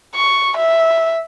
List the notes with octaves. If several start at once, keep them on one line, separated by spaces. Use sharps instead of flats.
C#6
E5